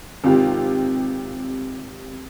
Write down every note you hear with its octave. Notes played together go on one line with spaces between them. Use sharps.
G#1 C3 F4 G4